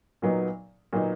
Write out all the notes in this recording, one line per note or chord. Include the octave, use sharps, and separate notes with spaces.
A#2 F#3 B3 D#4
A#2 F#3 B3 D#4